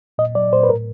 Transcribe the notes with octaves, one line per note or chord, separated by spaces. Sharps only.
A#2 D#5
F#3 D5
A#2 C5
B4
A2 A#4